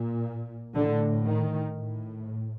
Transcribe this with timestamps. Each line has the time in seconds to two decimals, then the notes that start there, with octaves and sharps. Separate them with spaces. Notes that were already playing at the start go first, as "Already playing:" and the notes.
Already playing: A#2
0.74 A2 D3
1.25 D#3
1.77 A2